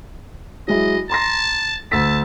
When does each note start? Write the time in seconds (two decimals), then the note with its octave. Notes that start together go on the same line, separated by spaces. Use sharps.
0.68 F#3 G#3 E4 D#5
1.10 A5 A#5 C6 A#6
1.92 D2 A5 E6 B6